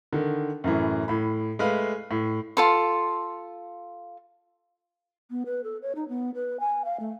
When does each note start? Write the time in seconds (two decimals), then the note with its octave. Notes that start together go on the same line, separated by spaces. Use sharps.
0.13 D3 D#3
0.64 F#2 A2 E3
1.08 A2 B5
1.59 G#3 A3 B4 F5
2.11 A2
2.57 F4 A4 C6
5.31 B3
5.46 B4
5.64 A4
5.82 C#5
5.95 D#4
6.09 B3
6.35 B4
6.60 G#5
6.85 F5
7.00 A3